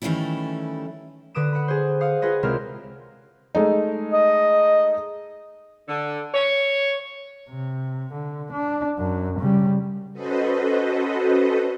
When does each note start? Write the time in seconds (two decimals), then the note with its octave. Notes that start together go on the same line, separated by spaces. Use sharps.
0.02 D#3 E3 G3 A3 C#4 E4
1.34 D3 B4 D#6 D7 E7
1.53 F#5 B5
1.68 G#4 C5
2.01 F5 F#5 D#6
2.22 F4 G#4 B4 D#5 F#5
2.43 C#2 C3 C4 E4 A#4 F6
3.55 G#3 A3 D#4
4.13 D#5
5.88 D3
6.34 C#5
7.50 C3
8.13 D3
8.52 D4
8.99 F#2
9.39 C#3 G3
10.13 C#4 F#4 A4 B4 C5 D#5